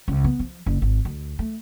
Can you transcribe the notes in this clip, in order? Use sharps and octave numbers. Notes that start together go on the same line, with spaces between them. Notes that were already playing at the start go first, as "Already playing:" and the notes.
C#2
B3
F3
F#1
G#1
D2
A3